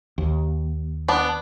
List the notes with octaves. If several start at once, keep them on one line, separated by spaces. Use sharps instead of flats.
D#2
B3 D4